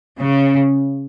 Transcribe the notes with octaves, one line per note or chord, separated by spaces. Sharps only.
C#3